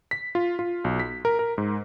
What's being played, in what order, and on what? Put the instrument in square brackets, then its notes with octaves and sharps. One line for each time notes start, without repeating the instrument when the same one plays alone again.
[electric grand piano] B6
F4
F4
B1
B6
A#4
A#4
G#2